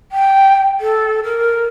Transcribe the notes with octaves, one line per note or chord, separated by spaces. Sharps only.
G5
A4
A#4